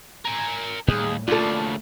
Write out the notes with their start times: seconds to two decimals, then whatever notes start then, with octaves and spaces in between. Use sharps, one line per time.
0.25 A#4 G#5
0.88 D#2 A2 G3 G#4
1.28 D2 C#3 A3 A#3 F4 A4 D5